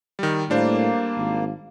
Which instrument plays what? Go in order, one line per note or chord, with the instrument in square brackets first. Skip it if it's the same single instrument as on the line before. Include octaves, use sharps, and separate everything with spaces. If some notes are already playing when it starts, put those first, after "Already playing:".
[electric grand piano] D#3 G3
[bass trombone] A2 [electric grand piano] G3 D4 C5 [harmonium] A#3
[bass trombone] G#1